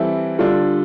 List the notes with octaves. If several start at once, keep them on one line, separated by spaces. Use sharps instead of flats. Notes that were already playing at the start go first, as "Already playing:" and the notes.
Already playing: E3 G3 C4 E4 A4
D3 G3 D4 F4 A4